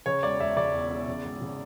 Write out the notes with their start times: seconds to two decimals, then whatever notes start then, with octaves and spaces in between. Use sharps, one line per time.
0.06 C#3 C#5
0.23 E1 D5
0.40 E1 E5
0.57 C#3 D5
0.74 E2
0.91 E2
1.07 C#3
1.25 G#1
1.41 C#3